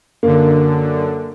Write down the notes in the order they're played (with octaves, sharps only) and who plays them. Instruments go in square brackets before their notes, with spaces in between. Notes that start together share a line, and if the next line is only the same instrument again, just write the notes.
[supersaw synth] F#2 D3 [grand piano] A#3